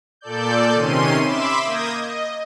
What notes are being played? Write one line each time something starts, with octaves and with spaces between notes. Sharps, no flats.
A#2 A4 D5 G6
C3 D#3 C#4 C6 D#7
E5 B5 C6 D6 E7
A#3 D#6 G6 G#6 A#6
D#5